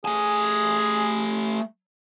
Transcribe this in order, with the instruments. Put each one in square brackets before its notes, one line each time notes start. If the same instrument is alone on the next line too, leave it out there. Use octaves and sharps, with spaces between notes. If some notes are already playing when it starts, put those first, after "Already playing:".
[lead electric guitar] A3 G#5 [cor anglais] G#4